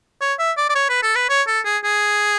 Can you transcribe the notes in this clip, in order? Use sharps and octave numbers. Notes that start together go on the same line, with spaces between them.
C#5
E5
D5
D5
C#5
B4
A4
B4
C#5
A4
G#4
G#4